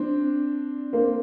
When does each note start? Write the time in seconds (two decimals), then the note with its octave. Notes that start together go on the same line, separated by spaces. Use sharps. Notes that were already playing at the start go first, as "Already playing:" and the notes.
Already playing: C4 D4
0.93 A#3 C4